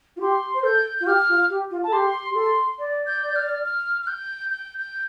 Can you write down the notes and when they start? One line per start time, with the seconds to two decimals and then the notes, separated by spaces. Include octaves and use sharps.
0.16 F4
0.21 G4 C6
0.54 C5
0.63 A4 G6
0.99 F4 G6
1.07 G4 F6
1.29 F4
1.50 G4
1.71 F4
1.84 A4 A5
1.93 G4 C6
2.31 G4
2.35 A4 C6
2.79 D5
3.07 G6
3.36 F6
3.65 F6
4.02 F6
4.07 G6
4.50 G6
4.78 G6